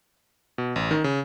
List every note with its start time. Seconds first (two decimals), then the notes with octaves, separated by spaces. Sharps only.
0.58 B2
0.76 A1
0.91 D#3
1.04 C#3